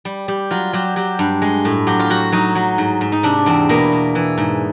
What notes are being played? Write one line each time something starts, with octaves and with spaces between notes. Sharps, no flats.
G3
G3 G4
F#3 F4
F#3 G4
F#3 G4
G2
G#3
A2
F#3 G4
F4
F#3 F#4
F#3 D#4
F#3
G#2
G#2
D#4
C3 D4
E2 C4
B2 A#3
B2
E3
G#2